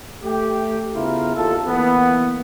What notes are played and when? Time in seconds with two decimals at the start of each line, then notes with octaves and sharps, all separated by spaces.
0.24 A3 G4
0.94 C#3 B3 E4 F4 A#4
1.36 D#2 F4 A4
1.67 E3 A#3 B3